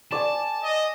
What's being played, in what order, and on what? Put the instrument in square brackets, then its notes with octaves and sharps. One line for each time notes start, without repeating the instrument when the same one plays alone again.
[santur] D5 G#5 [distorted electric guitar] A5
[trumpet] D#5